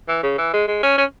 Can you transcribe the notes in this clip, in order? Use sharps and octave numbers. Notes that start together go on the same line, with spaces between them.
E3
C#3
E3
G#3
G#3
C#4
C#4